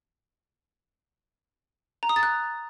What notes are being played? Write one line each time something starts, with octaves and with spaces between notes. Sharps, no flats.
A#5
D#6
A6
F#6